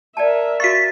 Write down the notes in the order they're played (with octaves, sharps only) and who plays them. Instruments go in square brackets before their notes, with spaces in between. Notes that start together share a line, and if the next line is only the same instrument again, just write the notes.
[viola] A#4 E5 [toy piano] D5 G5 A5
[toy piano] F#4 F5 C#6 [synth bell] A6 B6